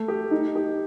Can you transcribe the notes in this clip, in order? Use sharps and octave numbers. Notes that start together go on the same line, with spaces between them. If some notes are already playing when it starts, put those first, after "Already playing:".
Already playing: A3
G4
D#4
G4